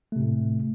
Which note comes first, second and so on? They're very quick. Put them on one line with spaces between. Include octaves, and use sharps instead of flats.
A3 C3 A2